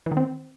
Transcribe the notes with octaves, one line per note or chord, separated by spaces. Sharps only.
E3
D#3
C4